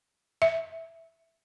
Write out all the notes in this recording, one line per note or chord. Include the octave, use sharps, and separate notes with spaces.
E5